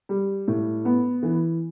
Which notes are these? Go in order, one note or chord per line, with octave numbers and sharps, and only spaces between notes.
G3
A2
B3
E3